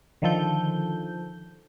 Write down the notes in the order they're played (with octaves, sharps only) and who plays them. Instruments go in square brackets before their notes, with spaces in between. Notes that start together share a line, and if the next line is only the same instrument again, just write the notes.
[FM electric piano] D3 D#3 F3 A4 G6